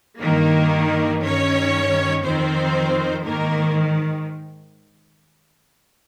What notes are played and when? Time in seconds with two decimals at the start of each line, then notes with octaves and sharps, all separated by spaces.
0.21 G2 D#3 A#3 A#4
1.22 G2 D#3 C#4 C#5
2.23 F2 D#3 C4 C5
3.25 G#2 D#3 A#3 A#4